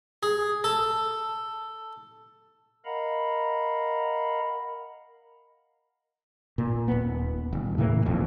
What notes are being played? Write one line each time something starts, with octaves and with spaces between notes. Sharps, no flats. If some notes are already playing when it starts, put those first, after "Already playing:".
G#4
A4
A#4 D#5 F5 F#5 A#5 B5
A#2
D#1 B3
D#1
A2 C#3 E3 A#3
D#1 B1 F2